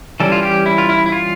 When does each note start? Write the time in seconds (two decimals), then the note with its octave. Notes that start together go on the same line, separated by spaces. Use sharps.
0.20 E3 G3 C#4 A4
0.32 F4
0.43 G4
0.66 E4
0.78 F4
0.89 E4
1.06 E4
1.12 F4